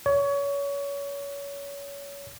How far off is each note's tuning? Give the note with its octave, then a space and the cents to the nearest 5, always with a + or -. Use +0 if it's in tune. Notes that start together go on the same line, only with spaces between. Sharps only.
C#5 +25